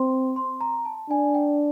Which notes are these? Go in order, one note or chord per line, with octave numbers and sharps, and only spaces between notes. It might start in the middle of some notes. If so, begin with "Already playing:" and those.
Already playing: C4 C6
C6
A#5
A5
D4 G#5
G5